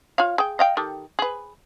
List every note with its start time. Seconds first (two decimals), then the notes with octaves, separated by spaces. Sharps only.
0.18 F4 C#5 F5
0.38 G#4 G5
0.59 D#5 F5 G5
0.77 D#3 G4 A4
1.19 G#4 B4